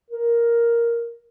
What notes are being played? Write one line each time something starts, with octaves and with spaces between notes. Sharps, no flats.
A#4